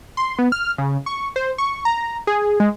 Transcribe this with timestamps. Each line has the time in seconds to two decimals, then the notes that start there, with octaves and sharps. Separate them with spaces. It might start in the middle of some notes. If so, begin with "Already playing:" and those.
0.17 C6
0.39 B3
0.52 F6
0.78 C#3
1.06 C#6
1.36 C5
1.58 C#6
1.85 A#5
2.27 G#4
2.60 G#3